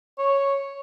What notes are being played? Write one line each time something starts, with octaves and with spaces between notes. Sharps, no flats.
C#5